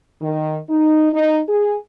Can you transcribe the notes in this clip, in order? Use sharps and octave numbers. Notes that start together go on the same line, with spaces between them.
D#3
D#4
D#4
G#4